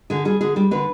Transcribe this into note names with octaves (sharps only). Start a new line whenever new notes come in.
D3 G#4
G3 G#4
D3 G#4
G3 G4
D3 B4